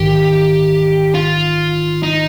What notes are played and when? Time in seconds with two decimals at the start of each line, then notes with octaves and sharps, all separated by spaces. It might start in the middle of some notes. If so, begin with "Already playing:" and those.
Already playing: A#1 G#2 D#3 G4
1.14 F4
2.03 D#4